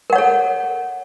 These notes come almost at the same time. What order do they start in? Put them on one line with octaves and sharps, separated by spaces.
A#4 F#5 C#5 A4